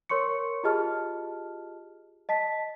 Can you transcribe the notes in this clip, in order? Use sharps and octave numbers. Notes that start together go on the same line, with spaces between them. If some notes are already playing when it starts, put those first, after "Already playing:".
A#4 C#5 C6 C#6 C#7
F4 G4 G#4 D#5 A5 F6
D#5 A5 B6